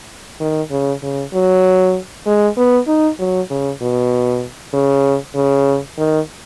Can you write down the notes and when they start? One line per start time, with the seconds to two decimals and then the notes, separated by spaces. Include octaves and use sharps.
0.41 D#3
0.71 C#3
1.02 C#3
1.33 F#3
2.26 G#3
2.58 B3
2.88 D#4
3.19 F#3
3.50 C#3
3.82 B2
4.74 C#3
5.35 C#3
5.98 D#3